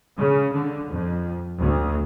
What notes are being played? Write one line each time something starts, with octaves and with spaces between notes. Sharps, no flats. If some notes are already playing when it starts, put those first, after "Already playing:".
C#3
D3
F2
D2